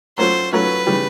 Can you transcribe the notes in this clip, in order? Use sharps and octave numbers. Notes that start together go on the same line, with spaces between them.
F#3 A3 C#4 F4 C5
F#3 A3 C#4 F4 B4
C#3 E3 G3